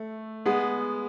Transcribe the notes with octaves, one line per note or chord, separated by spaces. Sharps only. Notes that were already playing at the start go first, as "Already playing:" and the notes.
Already playing: A3
G#3 B3